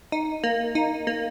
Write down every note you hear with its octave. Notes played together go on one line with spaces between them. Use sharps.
D#4
A#3
D#4
A#3